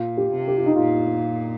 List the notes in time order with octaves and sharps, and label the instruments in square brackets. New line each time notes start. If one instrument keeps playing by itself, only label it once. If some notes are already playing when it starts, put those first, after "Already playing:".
Already playing: [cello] A#2 [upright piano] F4
[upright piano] G4
[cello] C3
[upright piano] G4
F4
D#4
[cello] A#2 [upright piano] F4